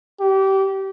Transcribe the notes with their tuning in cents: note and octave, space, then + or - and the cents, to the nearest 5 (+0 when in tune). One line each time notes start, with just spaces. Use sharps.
G4 -25